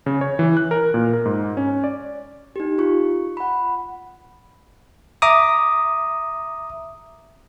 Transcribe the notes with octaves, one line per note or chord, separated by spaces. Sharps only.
C#3
C#5
E3
F#6
A#4
A#2
A#4
G#2
C#4
D5
D#4 G4
F4 C#6
F#5 B5
E5 A#5 D6 D#6